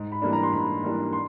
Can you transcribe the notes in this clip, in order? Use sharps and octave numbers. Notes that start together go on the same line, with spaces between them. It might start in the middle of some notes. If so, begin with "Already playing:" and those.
Already playing: G#2
B5
E3 G3 A#3 D4
A#5
C6
G#2 B5
E3 G3 A#3 D4
C6